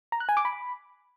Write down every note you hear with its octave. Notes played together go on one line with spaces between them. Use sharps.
A#5
F#6
G#5
D6
B5